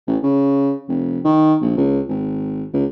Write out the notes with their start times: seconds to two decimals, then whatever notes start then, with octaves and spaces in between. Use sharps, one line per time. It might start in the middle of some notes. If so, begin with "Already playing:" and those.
0.07 A1
0.23 C#3
0.88 F1
1.24 D#3
1.61 A#1
1.77 C#2
2.09 G#1
2.73 C#2